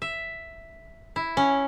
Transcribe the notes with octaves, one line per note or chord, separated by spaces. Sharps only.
E5
E4
C#4